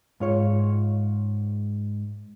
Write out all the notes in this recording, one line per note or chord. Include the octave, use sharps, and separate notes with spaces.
G#2 F4 C#5